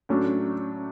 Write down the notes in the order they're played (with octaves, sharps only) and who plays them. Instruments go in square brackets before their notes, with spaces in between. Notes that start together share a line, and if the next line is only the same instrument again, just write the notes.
[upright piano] A2 F#3 A3 D4 [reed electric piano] C#4